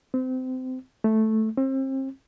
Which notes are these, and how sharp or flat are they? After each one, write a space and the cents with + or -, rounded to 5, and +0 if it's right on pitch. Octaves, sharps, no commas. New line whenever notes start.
C4 -25
A3 -5
C4 +35